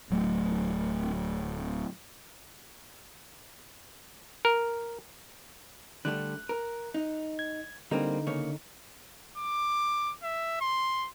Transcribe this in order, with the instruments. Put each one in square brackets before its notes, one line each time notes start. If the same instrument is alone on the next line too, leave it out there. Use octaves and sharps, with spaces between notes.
[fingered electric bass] D1 F#3 A3
[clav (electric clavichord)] A#4
[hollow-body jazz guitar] D3 G3 A3 [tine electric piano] F#6
[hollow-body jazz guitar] A#4
D#4
[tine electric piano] G#6
[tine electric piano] D3 D#4 [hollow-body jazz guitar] G3 A#3 C4
[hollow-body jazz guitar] C#3 A#3 C#5
[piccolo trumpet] D6
E5
C6